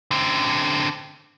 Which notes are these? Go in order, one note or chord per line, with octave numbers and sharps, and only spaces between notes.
D3 C4